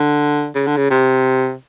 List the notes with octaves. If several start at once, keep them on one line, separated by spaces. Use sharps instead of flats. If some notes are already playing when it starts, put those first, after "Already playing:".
Already playing: D3
C#3
D3
C#3
C3